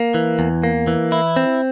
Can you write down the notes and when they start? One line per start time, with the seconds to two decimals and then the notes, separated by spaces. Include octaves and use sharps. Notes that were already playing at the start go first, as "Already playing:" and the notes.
Already playing: A#3
0.14 E3
0.39 E2
0.64 A#3
0.87 E3
1.12 E4
1.36 C4